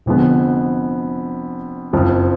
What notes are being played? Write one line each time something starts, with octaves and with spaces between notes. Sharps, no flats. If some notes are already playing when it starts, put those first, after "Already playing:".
F1 F2 D3 G#3 B3
F#1 F2 F3